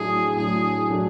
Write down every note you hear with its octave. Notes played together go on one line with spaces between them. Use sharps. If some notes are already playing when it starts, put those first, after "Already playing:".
Already playing: A2 F#3 A3 D4 G#4
A2 F#3 A3 D4 G#4
A2 F#3 A3 D4